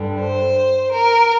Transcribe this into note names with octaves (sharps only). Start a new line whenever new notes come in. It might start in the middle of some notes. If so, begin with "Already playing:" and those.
Already playing: G2 D3 G3
C5
A#4